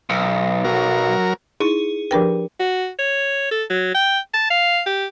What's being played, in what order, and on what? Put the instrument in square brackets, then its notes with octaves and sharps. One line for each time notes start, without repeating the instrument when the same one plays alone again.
[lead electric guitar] B1
[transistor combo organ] F#3 A#4
[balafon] D#4 E4 [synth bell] G#4
[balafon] F3 D4 B4 [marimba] G4 A#4 G5
[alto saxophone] F#4
C#5
A4
F#3
G5
A5
F5
G4